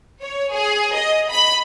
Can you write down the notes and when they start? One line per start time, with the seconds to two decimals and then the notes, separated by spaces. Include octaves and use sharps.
0.21 C#5
0.52 G#4
0.95 D#5
1.30 B5